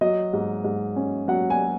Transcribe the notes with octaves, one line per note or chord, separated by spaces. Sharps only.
F#3 D#5
G#2
G#2
C#4
F#3 F#5
G#5